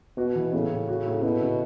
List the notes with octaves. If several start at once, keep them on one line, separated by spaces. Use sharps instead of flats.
B2 F#4
E3
A2 C#3
A2
F#4
A2
B2 E4
C#3